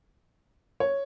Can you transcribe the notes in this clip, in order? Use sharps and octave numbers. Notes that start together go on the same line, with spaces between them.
C#5